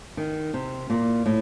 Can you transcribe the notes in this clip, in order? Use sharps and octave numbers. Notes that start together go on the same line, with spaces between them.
D#3
C3
A#2
A2